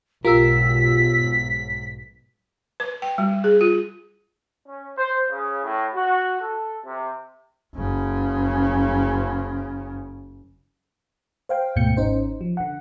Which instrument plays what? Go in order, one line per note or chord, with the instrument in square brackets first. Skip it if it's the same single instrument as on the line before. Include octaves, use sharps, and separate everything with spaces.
[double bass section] B1 G#2 [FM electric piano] F4 G4 E6 [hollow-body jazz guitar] A#4 [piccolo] B6
[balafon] B4
G5
G3
G#4
F4
[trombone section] C#4
C5
C#3
A2
F#4
A4
C3
[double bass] F#1 C#3
[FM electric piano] C5 F5 G5
D2 G#2 B2 A3 G6 C#7
G#1 C#4 D#4 C5
F3
D3 F#5